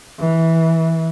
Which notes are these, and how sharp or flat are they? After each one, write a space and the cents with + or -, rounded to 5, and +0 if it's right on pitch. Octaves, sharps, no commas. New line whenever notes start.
E3 -15